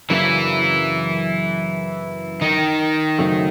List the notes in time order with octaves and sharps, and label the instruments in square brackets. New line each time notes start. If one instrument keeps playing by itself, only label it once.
[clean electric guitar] F#2 C#3 F#3 A#3 D4 [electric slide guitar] E3 E4
[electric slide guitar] D#3 D#4
[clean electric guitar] F#2 C#3 F#3 A3 C4